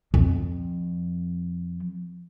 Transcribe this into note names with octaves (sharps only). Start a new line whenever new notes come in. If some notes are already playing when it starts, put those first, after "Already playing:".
F2 F3